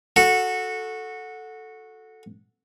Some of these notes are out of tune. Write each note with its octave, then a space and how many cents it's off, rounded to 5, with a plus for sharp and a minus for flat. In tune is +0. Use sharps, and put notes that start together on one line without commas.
F#4 -15 A4 +0